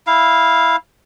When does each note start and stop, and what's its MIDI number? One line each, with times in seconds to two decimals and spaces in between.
0.07 0.76 64
0.07 0.76 77